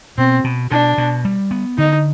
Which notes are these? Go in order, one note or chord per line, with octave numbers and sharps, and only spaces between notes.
B2 C4
B2
B2 D4
B2
G3
B3
D3 D#4